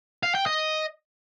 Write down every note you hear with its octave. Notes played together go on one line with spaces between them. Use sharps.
F5
G5
D#5